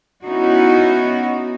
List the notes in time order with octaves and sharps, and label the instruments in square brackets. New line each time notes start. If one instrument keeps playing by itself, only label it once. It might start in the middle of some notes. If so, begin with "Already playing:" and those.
[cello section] B3 C#4 D#4 E4 F#4